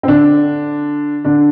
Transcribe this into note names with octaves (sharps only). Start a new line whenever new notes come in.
C4
D3 D4
D3 D4